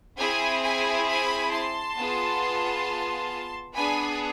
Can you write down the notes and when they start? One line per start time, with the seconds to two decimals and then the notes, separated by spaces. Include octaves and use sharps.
0.18 C4 E4 G#4 G#5 B5
0.62 G#5 B5
1.06 G#5 B5
1.52 A5 C6
1.96 B3 F4 G#4
3.74 B3 D4 G#4 G#5 B5